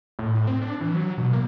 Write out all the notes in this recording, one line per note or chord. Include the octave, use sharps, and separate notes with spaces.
A2
A2
C4
D4
E3
F#3
B2
A#3